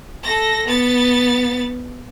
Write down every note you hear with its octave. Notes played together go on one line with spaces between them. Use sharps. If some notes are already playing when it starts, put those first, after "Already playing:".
A4 A#6
B3 A6